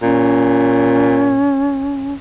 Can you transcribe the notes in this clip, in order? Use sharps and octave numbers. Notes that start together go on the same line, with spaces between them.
A#2 C#4